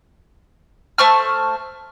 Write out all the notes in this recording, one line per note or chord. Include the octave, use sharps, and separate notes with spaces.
A3 C5 C#6 F6